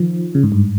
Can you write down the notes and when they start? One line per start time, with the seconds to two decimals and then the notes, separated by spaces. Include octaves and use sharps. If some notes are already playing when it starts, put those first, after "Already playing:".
Already playing: D#3 F3
0.35 C#3
0.43 G#2
0.52 G2